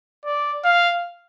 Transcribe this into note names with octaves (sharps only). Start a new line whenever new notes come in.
D5
F5